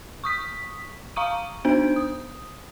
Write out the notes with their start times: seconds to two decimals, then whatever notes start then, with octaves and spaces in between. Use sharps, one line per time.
0.24 C#6 D#6 B6
1.16 F5 A#5 C#6 D#6 D#7
1.65 B3 D4 C5 G6 D7
1.96 D#6